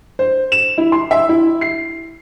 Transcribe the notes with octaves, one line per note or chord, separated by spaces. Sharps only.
C5
E7
E4
C6
E5
E4
C7